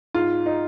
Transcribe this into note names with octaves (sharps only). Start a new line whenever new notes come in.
G#2 F4
D#4